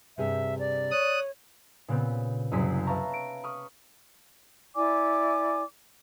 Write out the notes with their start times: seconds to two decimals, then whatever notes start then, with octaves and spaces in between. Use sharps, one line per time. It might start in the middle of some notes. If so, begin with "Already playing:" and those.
0.18 G2 C3 G#4 E5
0.59 D5
0.91 C#5 D#6 F#6
1.88 A#2 C#3 B3 C4 G4
2.51 F#1 C2 F#2 G#4 C6 B6
2.86 B4 E5 F5 A5 A#5 C#6
3.14 D7
3.43 B5 C#6 D#6 F6
4.75 E4 D5 G#5 D6